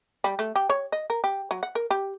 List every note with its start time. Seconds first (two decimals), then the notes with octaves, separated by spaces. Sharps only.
0.24 G3
0.39 A3
0.56 G4
0.70 C#5
0.92 D#5
1.10 A#4
1.24 G4
1.51 F#3
1.63 F#5
1.75 A#4
1.91 G4